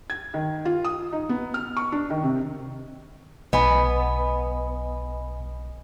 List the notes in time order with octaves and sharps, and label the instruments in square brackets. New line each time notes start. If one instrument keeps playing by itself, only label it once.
[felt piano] G#6
D#3
F4
D#6
D#4
B3
F6
C#6
D4
D#3
C3
[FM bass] B1 [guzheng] B3 [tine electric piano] D#5 G#5 B5